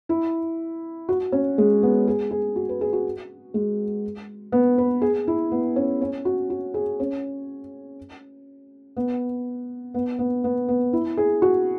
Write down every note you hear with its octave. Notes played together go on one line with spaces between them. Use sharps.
E4
F#4
C#4
G#3
B3
G#4
G#4
F#4
B4
G#4
F#4
G#3
B3
B4
G#4
E4
B3
C#4
C#4
F#4
F#4
G#4
C#4
B3
B3
B3
B3
B3
E4
G#4
F#4